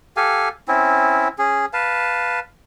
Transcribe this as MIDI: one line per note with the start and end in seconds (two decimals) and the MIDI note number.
0.17 0.49 67
0.17 0.49 69
0.17 0.49 77
0.17 0.49 80
0.68 1.28 60
0.68 1.28 61
0.68 1.28 64
1.38 1.66 61
1.38 1.66 68
1.73 2.40 71
1.73 2.40 77
1.73 2.40 81